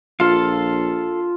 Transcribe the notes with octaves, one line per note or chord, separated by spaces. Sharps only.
A#1 F4 A4 F5